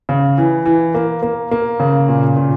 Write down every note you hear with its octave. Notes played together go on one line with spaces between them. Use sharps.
C#3
E3
E3
A#3
A#3
A#3
C#3
A#2
A#2